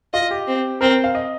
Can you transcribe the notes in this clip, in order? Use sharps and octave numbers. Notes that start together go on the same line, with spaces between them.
F4 D#5
G4
C4
C4 A#4
F5
D#5